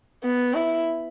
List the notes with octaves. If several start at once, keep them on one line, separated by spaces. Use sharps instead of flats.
B3
E4